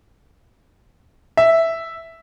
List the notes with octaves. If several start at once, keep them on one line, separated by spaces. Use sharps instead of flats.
E5